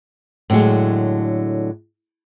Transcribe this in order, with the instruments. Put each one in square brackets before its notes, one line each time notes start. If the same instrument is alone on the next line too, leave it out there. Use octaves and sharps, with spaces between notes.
[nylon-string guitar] A2 D3 E3 F#3 G#3